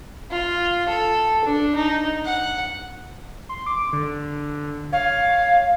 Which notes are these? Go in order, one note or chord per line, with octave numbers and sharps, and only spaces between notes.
F4
A4
D4
D#4
F#5
C6
D6
D3
C#5 F5